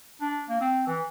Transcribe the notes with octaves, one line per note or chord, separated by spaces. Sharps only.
D4
A#3
C4
E3